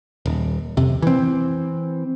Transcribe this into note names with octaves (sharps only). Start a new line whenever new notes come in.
D#1
F2 C3
E3 C4